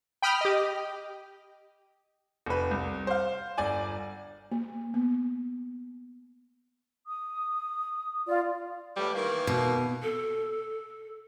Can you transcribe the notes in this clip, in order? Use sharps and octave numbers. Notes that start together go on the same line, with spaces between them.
G5 B5 D#6 F6
G4 D#5
F1 B4
C2
C5 F5
G1 D5 G#5
A#3
B3
D#6
F4 D5
A2 E3 G3
D#3 E3 A#3
B2
A4